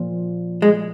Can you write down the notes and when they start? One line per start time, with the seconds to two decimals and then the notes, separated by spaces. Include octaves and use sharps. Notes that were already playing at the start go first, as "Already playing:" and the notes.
Already playing: A#2 F3
0.62 G#3